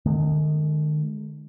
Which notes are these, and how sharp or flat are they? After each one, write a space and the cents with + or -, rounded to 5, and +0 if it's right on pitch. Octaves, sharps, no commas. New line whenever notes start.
D#3 -40 G#3 +25